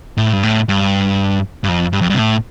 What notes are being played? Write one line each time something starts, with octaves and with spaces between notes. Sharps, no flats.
A2
G2
A2
G2
G2
F2
G2
F2
G2
C3
A2